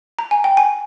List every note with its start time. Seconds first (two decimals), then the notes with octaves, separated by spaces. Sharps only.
0.19 A#5
0.31 G#5
0.44 G5
0.57 G#5